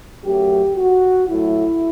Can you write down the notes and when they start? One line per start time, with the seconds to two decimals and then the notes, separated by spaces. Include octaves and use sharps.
0.24 F#2 F#3 A3 G4
0.77 F#4
1.28 A2 F#3 A3 E4